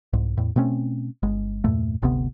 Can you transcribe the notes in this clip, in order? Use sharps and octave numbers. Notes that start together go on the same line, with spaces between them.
C2 G#2
E2 A2
B2 A3 C4 C#4
G1 G#3
E2 G2 A#2 A3
G1 D2 C3 B3